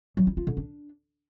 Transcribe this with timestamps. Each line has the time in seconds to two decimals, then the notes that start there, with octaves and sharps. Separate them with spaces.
0.17 F#3
0.27 E4
0.37 F4
0.47 D3
0.57 D4